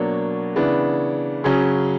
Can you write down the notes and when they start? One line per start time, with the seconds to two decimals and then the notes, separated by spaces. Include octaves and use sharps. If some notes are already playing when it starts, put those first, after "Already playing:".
Already playing: B2 F#3 A#3 D4 C#5
0.56 C#3 E3 B3 D4
1.44 C#3 F#3 C#4